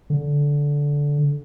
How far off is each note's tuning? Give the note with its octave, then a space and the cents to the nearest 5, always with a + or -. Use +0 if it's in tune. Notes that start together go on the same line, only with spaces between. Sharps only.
D3 -15